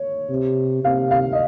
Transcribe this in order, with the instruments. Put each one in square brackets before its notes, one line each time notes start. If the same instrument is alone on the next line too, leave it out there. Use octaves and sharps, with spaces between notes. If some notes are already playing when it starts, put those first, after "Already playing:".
Already playing: [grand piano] C#5
[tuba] C3
[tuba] C3 [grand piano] F5
[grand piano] F5
D#5